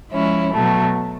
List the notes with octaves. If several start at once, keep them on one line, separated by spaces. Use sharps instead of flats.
F3 G#3 C#4 E4
B2 F#3 A3